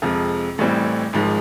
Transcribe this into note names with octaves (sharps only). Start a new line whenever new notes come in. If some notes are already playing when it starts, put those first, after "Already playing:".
F2 C3 F3 G#3
A1 A2 E3 G3 C4
G#1 G#2 F3 G#3